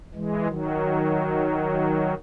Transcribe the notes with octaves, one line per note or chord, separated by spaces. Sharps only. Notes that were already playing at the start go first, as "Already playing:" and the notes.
E3 G#3
D#3 F#3